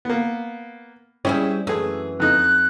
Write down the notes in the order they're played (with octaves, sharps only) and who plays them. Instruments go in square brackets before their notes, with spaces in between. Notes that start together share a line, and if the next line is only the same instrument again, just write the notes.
[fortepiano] A#3 B3
[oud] G3 C4 G#4 [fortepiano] C#4 E4
[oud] F#2 E3 [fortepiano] A3 G#4
[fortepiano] F2 D#4 [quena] F#6